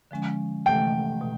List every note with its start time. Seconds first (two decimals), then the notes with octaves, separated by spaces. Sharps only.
0.11 D3 F3 G#3 C#4
0.66 C3 E3 A3 G5
1.21 B2